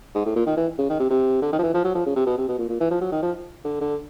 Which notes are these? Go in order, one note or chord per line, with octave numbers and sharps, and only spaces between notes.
G#2
A2
A#2
D#3
E3
C#3
D#3
C3
C3
D3
D#3
F3
E3
F3
F#3
F3
C#3
C3
B2
C3
B2
A#2
A#2
E3
F3
F#3
D#3
F3
D3
D3